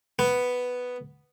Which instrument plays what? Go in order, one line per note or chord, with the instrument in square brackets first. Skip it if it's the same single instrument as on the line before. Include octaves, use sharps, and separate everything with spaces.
[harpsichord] B3